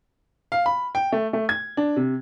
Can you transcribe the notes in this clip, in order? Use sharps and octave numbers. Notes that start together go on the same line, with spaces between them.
F5
B5
G5
A3
A3
G#6
D4
C3